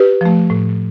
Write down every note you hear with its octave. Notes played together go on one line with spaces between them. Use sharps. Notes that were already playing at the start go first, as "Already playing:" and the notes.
Already playing: G4 B4
F3 A3
A2